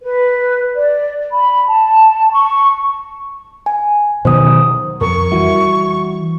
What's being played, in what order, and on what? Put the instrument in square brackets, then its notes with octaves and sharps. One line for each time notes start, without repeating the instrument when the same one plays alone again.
[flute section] B4
D5
B5
A5
C#6
[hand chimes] G#5
[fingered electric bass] B2 D#3 F#3 [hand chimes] C5 D#6
[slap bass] F2 [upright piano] A#4 [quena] C#6
[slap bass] E3 G3 [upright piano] E4 F#4 E5